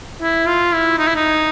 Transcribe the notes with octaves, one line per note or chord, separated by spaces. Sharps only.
E4
F4
E4
D#4
E4
D#4